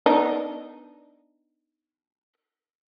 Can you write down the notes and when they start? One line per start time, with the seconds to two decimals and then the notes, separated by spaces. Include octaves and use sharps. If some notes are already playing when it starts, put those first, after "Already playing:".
0.06 B3 D4 D#4